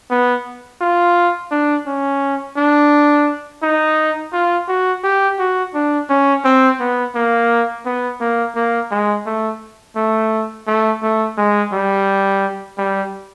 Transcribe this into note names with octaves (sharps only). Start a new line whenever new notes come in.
B3
F4
D4
C#4
D4
D#4
F4
F#4
G4
F#4
D4
C#4
C4
B3
A#3
B3
A#3
A#3
G#3
A3
A3
A3
A3
G#3
G3
G3